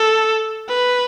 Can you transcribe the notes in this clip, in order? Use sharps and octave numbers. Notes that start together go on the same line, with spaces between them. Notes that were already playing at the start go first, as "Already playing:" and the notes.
Already playing: A4
B4